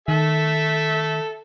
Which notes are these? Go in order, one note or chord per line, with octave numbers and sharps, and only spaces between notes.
D#3 A4 E5